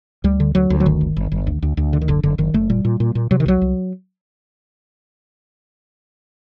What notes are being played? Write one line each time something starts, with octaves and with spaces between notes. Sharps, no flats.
D2 G3
D3
D2 F#3
D2
F#3
G1 D#3
G1
G1
G1
D2
D2
D2
D3
D#3
F#1 D3
F#1 D3
F#1 D#3
F#1 A3
A#2 G3
A#2
A#2
A#2
C3 F#3
D#3
C2 F#3
C2